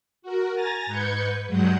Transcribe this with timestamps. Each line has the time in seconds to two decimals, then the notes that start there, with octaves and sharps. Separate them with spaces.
0.22 F#4 A#4
0.54 G#5 A#5 A6 A#6
0.86 G#2 B4 G6 G#6 C#7
1.47 G2 F#3 G#3 F#5 G6